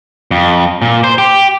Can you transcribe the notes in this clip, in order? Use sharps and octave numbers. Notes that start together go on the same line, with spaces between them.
F2
A#2
C5
G4